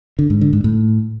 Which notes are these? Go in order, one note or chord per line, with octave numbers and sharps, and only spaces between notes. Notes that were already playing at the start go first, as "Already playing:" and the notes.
D3
G#2
D3
G#2
A2